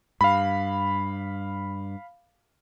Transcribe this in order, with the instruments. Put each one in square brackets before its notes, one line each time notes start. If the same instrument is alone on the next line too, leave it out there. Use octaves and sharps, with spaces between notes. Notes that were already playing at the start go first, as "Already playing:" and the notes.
[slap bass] G2 [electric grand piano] F5 B5